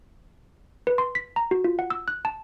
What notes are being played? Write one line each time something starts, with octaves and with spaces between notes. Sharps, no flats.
B4
C6
B6
A#5
F#4
F4
F#5
E6
F#6
A5